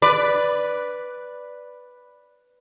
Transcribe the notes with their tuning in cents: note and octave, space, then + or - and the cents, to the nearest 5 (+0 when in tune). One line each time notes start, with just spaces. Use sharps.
B4 +0 D5 +0